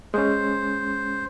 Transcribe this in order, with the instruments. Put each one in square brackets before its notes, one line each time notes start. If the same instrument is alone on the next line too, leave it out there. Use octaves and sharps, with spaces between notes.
[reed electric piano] G#3 C#4 [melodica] C5